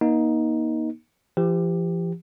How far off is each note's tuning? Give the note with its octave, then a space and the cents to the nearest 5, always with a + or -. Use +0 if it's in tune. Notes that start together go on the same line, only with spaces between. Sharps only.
A#3 +35 D#4 +10
F3 -45 G4 +10